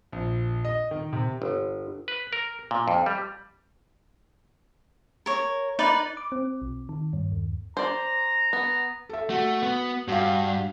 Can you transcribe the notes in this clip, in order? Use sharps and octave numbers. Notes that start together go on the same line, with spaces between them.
A#1
D#5
D#3
C3
G1
B4
A#4
A#2
F2
G3
A#4 C#5
D#4 B4 D5
D6
C4
B1
D#3
G2
D#2
C5 D5 A#5
B3
A4 E5
A3 F#4
B3
G2 F#4 F5